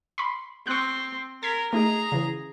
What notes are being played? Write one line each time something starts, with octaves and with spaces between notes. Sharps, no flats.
B5 C6
C4 C#6 F#6
A#4 G#6 B6
A3 D#4 G#4 A#5
C#3 E3